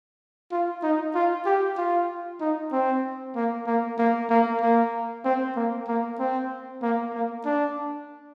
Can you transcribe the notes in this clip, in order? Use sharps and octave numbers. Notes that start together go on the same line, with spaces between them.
F4
D#4
F4
G4
F4
D#4
C4
A#3
A#3
A#3
A#3
A#3
C4
A#3
A#3
C4
A#3
A#3
D4